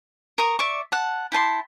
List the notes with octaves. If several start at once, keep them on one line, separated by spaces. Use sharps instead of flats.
A#4 A#5 C#6 D#6
D5 E5 C#6
F#5 A5
E4 G5 A5 C6